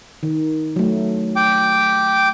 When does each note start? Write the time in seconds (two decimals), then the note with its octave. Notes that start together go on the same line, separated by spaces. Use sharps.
0.23 D#3
0.76 F#3 A3
1.36 G5 D6